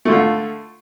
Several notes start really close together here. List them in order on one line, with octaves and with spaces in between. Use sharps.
A3 D3 F4